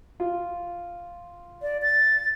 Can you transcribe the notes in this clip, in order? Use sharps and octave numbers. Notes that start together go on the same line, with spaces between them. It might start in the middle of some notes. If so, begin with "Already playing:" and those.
F4
D5
A6